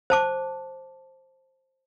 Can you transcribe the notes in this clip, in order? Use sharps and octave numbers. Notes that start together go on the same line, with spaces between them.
C5 A5 D6